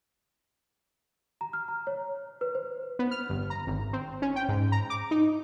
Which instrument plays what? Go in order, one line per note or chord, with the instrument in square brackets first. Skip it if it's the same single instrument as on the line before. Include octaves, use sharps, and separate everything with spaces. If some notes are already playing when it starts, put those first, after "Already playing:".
[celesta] A#5
F6
A#5
C#5
B4
C5
[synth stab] B3
F6
G1
A#5
G#1
C4
C#4
G5
G#2
A#5
D6
D#4